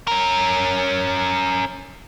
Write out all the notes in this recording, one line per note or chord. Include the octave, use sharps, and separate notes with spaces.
C#4 A#4